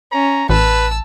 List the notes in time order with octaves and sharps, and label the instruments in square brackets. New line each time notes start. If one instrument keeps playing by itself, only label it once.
[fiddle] C#4 [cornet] A#5
[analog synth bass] A1 [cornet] B4 [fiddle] A5 E6